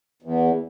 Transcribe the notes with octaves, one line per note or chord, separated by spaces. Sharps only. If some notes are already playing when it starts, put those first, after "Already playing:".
E2